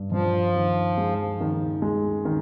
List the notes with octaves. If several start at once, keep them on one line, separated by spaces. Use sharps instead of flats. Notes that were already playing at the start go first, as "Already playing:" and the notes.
Already playing: G2
G2 F3
D#3
G#3
D#3
G#3
D#3